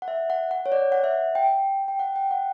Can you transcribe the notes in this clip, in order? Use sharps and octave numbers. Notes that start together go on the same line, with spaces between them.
F#5
E5
F#5
F#5
C#5
D5
F#5
E5
G5
G5
F#5
G5
F#5